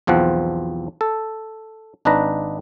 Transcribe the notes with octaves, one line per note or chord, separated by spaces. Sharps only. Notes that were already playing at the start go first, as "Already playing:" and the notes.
B1 E2 F3 C4 F#5
A4
G#1 D4 D#4 B4 A#5